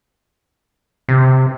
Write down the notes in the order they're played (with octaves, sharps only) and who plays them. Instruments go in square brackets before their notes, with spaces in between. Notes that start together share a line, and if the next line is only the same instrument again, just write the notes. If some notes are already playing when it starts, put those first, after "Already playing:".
[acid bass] C3